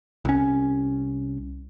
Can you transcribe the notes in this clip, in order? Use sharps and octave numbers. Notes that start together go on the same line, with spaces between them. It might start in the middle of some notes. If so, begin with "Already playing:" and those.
C2 C#4